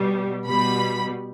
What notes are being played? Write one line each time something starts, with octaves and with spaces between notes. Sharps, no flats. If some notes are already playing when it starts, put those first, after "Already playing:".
Already playing: B2 G3
B2 G3 B5